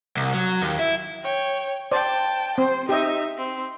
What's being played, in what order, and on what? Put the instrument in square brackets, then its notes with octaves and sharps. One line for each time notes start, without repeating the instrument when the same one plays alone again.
[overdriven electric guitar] C2
F#3
D#2
E4
[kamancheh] C#5 G5
[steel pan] C5 D5 [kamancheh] G5 A5
[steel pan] C4 [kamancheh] C5
[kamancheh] D#4 E5 [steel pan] G4 D#5
[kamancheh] C4